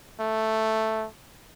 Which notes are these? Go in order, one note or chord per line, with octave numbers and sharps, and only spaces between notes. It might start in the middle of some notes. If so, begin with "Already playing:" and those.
A3